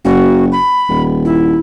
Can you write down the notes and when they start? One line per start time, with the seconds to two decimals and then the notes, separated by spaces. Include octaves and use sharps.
0.05 F#1 F#4
0.52 B5
0.89 D#1
1.25 E4